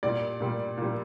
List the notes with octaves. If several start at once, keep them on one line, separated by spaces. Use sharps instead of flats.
A#2 G3 D5
A#2 G3
A#2 G3